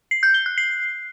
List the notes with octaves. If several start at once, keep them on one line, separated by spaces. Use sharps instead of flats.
C7
G6
G7
F#6
C7